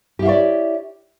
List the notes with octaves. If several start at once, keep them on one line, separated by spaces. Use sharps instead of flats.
E4 G4 C#5 D5 F5